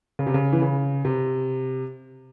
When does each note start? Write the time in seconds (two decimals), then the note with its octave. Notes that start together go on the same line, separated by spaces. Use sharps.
0.19 C#3
0.27 C3
0.34 C#3
0.52 E3
0.62 C#3
1.05 C3